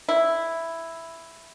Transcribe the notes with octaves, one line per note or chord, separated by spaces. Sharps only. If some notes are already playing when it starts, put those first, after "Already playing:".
E4